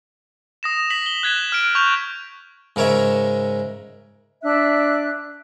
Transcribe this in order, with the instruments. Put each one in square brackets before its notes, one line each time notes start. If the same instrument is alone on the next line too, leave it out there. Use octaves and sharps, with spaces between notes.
[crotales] D#6 A#6 E7
B6 F#7
G7
F#6 G#6 B6 E7
F6 D7
C#6 G6 F7
[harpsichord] G#2 C#3 A#4 C#5 E5
[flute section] D4 E5 F#6